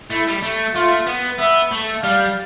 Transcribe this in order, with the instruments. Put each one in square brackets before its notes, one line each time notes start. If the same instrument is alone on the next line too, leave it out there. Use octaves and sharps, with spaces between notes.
[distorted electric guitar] A3 [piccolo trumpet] E4
[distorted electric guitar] G3
A3
[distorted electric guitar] A3 [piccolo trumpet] F4
[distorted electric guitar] B3
[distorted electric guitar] B3 [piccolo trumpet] E5
[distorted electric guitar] A3
[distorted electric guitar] G3 [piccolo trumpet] F5